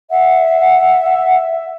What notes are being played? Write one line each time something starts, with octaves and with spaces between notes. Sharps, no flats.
E5 F#5